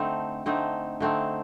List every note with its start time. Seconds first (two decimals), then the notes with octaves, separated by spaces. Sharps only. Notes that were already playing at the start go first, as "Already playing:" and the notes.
Already playing: D3 A3 C4 D#4
0.46 D3 A3 C4 D#4
1.00 D3 A3 C4 D#4